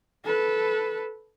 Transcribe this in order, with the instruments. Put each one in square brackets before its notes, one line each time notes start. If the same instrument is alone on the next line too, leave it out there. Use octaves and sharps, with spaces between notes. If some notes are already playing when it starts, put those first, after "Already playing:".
[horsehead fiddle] A4 B4